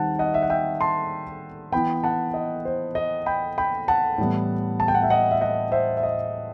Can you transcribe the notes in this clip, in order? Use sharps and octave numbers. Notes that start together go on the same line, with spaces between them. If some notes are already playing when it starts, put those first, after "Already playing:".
Already playing: D#3 G3 C4 F#5 A5
D#5 F#5
E5
F#5
E5 G5
A5 C6
E3 B3 G5 B5
F#5 A5
D#5
C5
D#5
G5 B5
G5 B5
F#5 A5
A2 E3 G3 B3
A5
G5
F#5
E5 G5
D#5 F#5
E5
D#5 F#5
C5 E5
E5
D#5